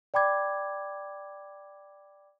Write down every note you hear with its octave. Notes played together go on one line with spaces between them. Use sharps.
D5 G5 B5 D6 G#6